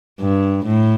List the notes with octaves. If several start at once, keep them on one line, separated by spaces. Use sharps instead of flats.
G2
A2